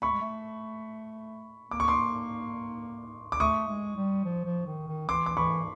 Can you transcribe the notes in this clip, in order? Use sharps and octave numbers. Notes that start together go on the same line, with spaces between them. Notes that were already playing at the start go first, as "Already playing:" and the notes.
A3 B5 C#6
G#3
A3
A#3 D6
C#6
C6 D6
D6
A3 C#6 D#6
G#3
G3
F3
F3
D#3
D#3
E3 C6 D6
D6
E3 B5 C#6